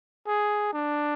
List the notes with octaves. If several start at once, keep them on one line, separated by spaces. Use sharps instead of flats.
G#4
D4